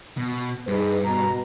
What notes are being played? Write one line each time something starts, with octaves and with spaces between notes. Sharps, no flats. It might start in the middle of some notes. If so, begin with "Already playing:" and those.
B2
G2 D#4 G#4 B4
B2 A#5